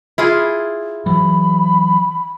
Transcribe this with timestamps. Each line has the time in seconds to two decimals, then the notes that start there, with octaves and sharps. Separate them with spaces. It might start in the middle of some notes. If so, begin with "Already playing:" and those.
0.18 E4 F4 G#4
1.06 E3 F#3 B5